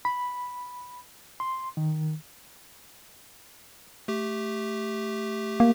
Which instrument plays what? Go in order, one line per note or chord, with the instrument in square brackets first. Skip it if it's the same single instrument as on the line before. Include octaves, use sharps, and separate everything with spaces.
[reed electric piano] B5
C6
D#3
[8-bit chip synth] A3 G4
[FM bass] A#3